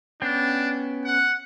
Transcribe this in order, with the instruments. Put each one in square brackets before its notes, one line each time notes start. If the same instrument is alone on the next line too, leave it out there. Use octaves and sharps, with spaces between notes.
[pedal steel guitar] B3 C#4 G5 [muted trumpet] D4
[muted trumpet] F#5